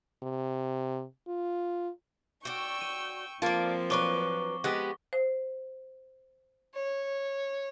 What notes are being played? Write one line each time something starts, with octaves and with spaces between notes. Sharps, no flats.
C3
F4
F#4 D5 G5 C#6 E6
D#7
F3 A#3 C4 F4 A4 D5
F#3 D4 B4 C#6 D6 G7
G#3 B3 G4 F#5
C5
C#5